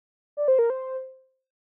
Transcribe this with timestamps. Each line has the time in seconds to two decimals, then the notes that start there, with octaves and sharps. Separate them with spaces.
0.37 D5
0.48 C5
0.59 A#4
0.70 C5